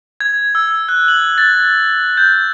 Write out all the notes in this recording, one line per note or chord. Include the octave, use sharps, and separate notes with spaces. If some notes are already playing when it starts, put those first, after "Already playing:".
G#6
E6
F#6
F#7
A6
G6